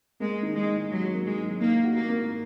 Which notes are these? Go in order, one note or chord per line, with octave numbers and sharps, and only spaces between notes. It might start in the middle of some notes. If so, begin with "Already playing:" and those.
G#3 A#3
D#3
G#3
D#4
F#3 F#4
A#3
G#3
D#3
A#3 D#4
F#4
A#3
A#3